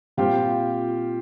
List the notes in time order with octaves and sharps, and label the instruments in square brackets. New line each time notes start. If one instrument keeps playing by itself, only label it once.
[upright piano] A#2 G3 C4 F4 G4